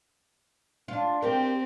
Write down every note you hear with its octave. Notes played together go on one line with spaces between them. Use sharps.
D4 F4
C4 G4 A#4